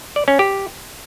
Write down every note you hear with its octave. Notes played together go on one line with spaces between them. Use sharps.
D5
C#4
G4